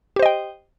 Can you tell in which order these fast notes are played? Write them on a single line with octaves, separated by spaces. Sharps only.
G4 C5 D#5 G5